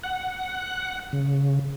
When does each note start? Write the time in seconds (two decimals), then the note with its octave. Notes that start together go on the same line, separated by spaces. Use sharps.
0.04 F#5
1.13 C#3